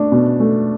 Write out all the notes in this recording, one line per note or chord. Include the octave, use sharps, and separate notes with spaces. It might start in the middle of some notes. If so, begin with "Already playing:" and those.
Already playing: A3 D4
B2
A3